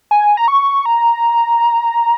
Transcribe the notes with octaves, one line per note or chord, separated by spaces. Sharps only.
G#5
A#5
C#6
A#5